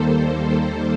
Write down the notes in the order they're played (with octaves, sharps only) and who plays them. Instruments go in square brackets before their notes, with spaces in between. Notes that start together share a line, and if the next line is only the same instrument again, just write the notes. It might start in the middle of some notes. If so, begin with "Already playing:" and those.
Already playing: [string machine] D#2 D#3 G3 A#3 A4 C5